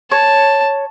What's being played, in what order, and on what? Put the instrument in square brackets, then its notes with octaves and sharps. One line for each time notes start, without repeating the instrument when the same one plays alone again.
[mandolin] C#5 [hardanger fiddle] A5